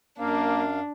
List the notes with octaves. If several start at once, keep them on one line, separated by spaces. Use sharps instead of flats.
F#2 A#3 D4 F5